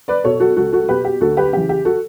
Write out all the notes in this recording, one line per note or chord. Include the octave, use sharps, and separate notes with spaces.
B4 D5
B2 A4 C#5
F#4 A4
C#2 F#4 A4
F#4 A4
B2 G4 B4
G4
D2 F#4 A4
G4 B4
C#3 E3 G4
G4
F#4 A4